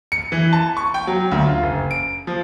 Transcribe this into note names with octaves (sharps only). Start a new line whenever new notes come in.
C#7
E3
A5
C#6
G5
F#3
D2
F4
F#1
D7
F3